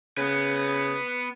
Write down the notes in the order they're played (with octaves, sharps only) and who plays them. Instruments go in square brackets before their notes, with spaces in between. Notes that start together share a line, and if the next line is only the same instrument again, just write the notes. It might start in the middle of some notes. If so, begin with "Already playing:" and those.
[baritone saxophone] C#3 [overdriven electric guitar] B3 B4